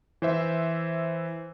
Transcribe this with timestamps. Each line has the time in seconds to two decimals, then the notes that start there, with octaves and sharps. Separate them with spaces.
0.22 E3 C5 E5